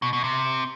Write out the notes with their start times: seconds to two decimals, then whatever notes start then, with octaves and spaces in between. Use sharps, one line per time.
0.02 B2
0.13 B2
0.24 C3